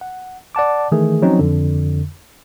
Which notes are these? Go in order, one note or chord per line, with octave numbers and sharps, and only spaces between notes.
F#5
D5 F#5 A5 D6
D#3 E3 A3 G#4
F3 F#3 C4 C#4 D#4
F2 D3